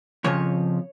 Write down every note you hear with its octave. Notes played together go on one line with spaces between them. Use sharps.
F2 C#3 F3 C#5